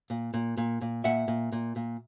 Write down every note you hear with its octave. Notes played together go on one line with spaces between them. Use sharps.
A#2
A#2
A#2
A#2
A#2 E5 F#5
A#2
A#2
A#2